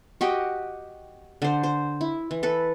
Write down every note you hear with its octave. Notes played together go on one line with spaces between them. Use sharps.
F#4 G4 D#5
D3 C5
C5
E4
E3
A4 B4